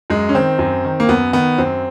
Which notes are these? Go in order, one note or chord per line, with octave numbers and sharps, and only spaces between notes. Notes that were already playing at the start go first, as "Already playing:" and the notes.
F#2 G#3
C#4
D#3 C4
F#2
D#3
A#3
F#2 B3
D#3 B3
F#2 C4